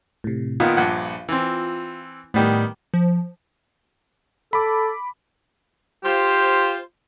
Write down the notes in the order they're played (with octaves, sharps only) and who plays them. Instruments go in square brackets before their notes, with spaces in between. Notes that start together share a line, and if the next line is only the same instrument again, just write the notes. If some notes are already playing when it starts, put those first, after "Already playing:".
[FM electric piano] A2 C3
[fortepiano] A#2 D#3 B3 [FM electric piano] F4
[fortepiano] A#1 G2 F#5
E3 C4
[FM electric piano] A2 G4 [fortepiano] D#3 G3 B3
[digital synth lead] F3
[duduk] A4 [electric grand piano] B5 D6
[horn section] F4 C5 [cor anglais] G4